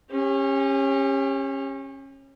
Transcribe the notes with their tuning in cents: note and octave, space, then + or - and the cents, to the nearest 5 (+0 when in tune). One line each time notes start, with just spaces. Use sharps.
C#4 -20 G4 +30